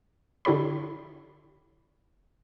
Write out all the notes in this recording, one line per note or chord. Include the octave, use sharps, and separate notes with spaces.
D3 E4 G4 C#5 B5